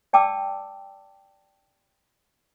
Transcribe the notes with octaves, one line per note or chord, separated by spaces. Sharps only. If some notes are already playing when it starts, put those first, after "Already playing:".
D5 G5 A5 D6 E6